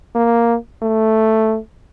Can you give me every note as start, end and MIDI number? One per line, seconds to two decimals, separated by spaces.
0.15 0.56 58
0.82 1.57 57